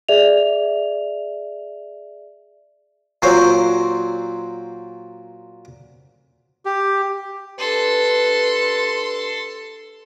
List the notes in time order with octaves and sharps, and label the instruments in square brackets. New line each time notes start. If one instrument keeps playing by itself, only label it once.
[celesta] G#4 D5 E5 F7
[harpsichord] A#2 F#3 C4 C5 C#5
[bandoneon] G4
[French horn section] D4 G4 B4 [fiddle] A4 C6